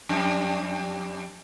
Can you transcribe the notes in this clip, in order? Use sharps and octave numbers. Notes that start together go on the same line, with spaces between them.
F2 G3 D4